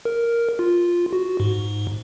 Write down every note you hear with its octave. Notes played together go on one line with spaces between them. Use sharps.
A#4
F4
F#4
G#2